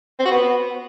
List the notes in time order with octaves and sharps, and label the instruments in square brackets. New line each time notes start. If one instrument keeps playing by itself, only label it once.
[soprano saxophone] C4
F#4
B3